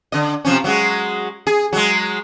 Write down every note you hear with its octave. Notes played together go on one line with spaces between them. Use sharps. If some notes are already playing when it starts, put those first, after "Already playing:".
D3 D#5
C3 F3 C#4
F#3 G#3 F#4
G#4
F#3 G#3